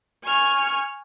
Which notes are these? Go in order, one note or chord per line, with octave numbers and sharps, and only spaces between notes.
G#5 C#6 F6